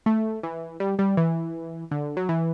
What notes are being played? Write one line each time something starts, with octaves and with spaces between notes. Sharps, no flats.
A3
E3
G3
G3
E3
D3
F#3
E3